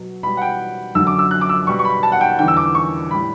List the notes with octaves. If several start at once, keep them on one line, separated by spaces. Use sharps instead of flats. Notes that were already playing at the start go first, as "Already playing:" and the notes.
Already playing: B2 F#3
B2 G3 B5
F#5
G5
F#2 D3 F#3 E6
D6
E6
F#6
D6
E6
B2 G3 C#6
C#6
B5
A5
F#5
G5
E2 D3 G3 G5
E6
D6
C#6
A2 G3 B5